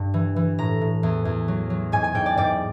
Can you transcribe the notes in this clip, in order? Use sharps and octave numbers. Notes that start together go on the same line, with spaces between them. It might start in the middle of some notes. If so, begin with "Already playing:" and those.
Already playing: G2
E3
E3
A2 A#5
A2
E2
E2
F#3
F#3
G#2 G#5
G#5
G#2 G5
D5
G#2 D5